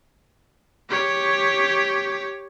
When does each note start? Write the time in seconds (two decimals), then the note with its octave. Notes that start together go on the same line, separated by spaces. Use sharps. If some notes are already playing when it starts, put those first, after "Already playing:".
0.89 G4 C#5